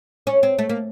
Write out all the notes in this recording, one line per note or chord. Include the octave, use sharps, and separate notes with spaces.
C#4
C4
A3
A#3